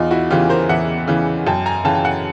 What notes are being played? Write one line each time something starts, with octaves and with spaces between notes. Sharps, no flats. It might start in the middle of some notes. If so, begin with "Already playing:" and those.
Already playing: E2 D#4 F4
E4 F#4
C#3 E3 F4 G4
A#4 C5
E2 E5 F#5
C#3 E3
F#2 G5 A5
G#5 A#5
C#3 E3 G5 A5
G5
F#5 G#5